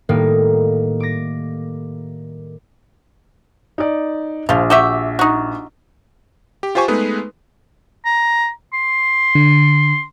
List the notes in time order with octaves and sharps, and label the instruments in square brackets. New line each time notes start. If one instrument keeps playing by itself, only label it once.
[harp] A2 D#3 G3 A#3 D#4
D6 A#6
[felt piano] D#4 D5
[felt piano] A#1 [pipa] F3 F4
[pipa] F#4 G4 E5
D#4 F#4
[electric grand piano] G4
F4 G4 C5 G#5 C#6
G#3 A3 B3 D#4 G#4 B4
[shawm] A#5
C6
[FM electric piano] D3